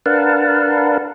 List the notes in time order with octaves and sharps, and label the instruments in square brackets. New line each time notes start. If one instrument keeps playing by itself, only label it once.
[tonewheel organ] D4 A#4 B4 F5 F#5 A5